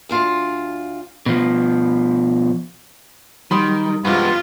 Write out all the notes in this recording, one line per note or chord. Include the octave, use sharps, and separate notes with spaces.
D2 D4 F4
B2 F3
D#3 F#3 G3 B5 C6 D#6
G2 C3 G#3 B3 F4